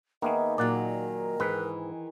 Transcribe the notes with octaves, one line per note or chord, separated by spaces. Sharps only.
D#3 A#3 B3 G#4 E5
A#2 F#3 A#4 D5 F#5
G#2 E3 B4